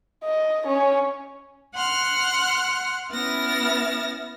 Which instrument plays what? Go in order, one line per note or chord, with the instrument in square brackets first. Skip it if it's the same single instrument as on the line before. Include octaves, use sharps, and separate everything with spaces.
[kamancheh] D#5
C#4
[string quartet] F#5 C6 F6 F#6
B3 C#4 E4 F6 A6 A#6